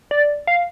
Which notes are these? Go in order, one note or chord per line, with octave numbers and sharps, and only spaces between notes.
D5
F5